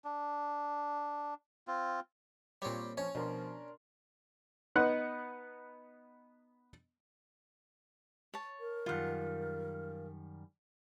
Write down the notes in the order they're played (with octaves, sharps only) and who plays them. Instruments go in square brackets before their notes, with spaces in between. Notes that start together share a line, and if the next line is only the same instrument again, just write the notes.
[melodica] D4
C4 F4
[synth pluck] A#2 C#5 [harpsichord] G3 C4
[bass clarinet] F3 [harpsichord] C#4 [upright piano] C#5
[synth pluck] B2 [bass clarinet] F3 [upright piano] D4 A#4 C6
[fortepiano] B3 D#4 F#5 F#6
[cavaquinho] C#5 A5
[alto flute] A#4
[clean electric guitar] F#2 D#3 G3 [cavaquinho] F4 F#5